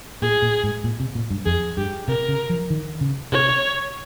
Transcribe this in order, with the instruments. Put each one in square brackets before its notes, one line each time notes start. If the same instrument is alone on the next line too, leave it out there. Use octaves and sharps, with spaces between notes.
[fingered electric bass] A#2 [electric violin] G#4
[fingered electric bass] A#2
G#2
A#2
C3
A#2
G2
[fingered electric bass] F2 [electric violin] G#4
[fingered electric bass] G2 [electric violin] G4
[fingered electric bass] C3 [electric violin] A#4
[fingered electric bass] C#3
F3
D#3
C#3
[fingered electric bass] C3 [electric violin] C#5